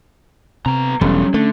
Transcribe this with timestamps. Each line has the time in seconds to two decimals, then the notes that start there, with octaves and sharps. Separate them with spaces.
0.66 C3 B3 A#5
1.01 E1 F#3 G3 C#4 A4
1.34 D3 A3